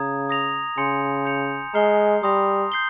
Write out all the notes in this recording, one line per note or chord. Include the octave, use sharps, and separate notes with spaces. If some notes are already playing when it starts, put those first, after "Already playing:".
Already playing: C#3 A#5 D#6 G#6
D#6 A#6 F7
C#3 G#5 C6 G6 C#7
G6 C#7 F7
G#3 A#5 F6 C7 G7
G3 C6 D#6 A#6 F7
G6 C7 G7